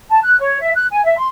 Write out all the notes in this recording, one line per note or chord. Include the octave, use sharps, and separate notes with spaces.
A5
F#6
C#5
E5
F#6
G#5
E5
C6